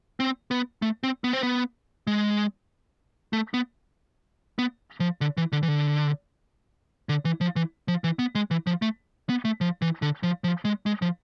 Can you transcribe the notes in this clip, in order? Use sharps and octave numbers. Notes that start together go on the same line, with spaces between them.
C4
B3
A3
C4
B3
C4
B3
G#3
A3
B3
B3
F3
D3
E3
D3
E3
D3
D3
E3
F3
E3
F3
E3
B3
G#3
E3
F3
A3
B3
A3
F3
E3
D3
F3
F3
G#3
G#3
F3